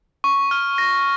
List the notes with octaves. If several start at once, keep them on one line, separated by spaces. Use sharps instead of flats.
C#6
F6
A#6